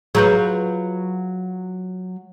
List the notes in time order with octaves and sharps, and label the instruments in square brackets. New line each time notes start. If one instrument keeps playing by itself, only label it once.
[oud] F#3 F4 B4 [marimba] G#4 A#5 G6